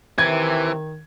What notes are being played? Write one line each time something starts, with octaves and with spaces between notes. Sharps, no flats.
C3 D#3 E3 G#6